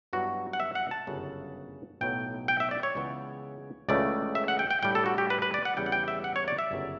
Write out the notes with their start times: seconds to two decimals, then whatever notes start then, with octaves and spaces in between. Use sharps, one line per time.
0.13 G2 F#3 B3 E4 F#4
0.53 F#5
0.60 E5
0.75 F#5
0.91 A5
1.07 G1 F#2 C#3
2.01 B1 A2 F#3 B3 G5
2.48 G5
2.60 E5
2.71 D5
2.83 C#5
2.95 C#2 C#3 E3 B3
3.89 C#2 C#3 E3 A3 D5
4.35 E5
4.48 F#5
4.59 G5
4.71 G5
4.83 A2 G3 D4 G5
4.95 A4
5.06 F#4
5.18 G4
5.30 B4
5.42 B4
5.54 D5
5.65 F#5
5.76 E2 C#3 G3 C#4 E4 G5
5.86 F#5
5.92 G5
6.08 E5
6.24 F#5
6.36 C#5
6.48 D5
6.58 E5
6.71 G1 F#2 C#3